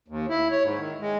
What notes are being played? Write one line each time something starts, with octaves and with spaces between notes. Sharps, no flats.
D#2
E4
C#5
G#2
D#3
G#3